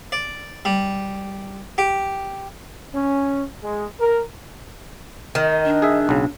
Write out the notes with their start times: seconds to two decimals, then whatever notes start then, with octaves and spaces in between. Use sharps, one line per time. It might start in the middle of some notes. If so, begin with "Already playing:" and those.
0.12 D5
0.65 G3
1.78 G4
2.95 C#4
3.63 G#3
4.01 A#4
5.35 D#3 D#5
5.65 D4
5.82 G#4 E5
6.09 B1 C#3